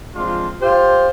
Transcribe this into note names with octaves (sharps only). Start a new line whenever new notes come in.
F3 G#3 C4 D4 F4
F4 G4 C5